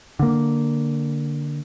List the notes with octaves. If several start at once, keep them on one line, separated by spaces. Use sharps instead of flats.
D3 A#3